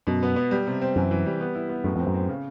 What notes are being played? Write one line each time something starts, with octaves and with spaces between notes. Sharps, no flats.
F#2 B2
B3
B3
G3
C3
C4
F#2 E3
E3
G3
B3
E4
B3
F#2 A2
F2 C4
F#2
C4
C#3